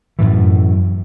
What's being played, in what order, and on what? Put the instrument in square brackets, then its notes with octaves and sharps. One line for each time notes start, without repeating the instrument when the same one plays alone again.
[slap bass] F#2 A2 E3